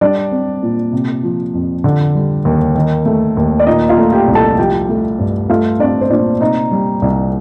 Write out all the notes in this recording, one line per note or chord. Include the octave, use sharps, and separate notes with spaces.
G3 D4 D5
C4
A#2
C3
F3
F2
D3
G3
D#2
D#3
A3
D#2
D5
A#2 D#4 D#5
F4 F5
A3
G4 G5
C2
A4 A5
F3 G4 G5
A3
G2
A3 F4 F5
C4 D4 D5
C5
A#2 D4 D5
C3 D#4 D#5
G3
C2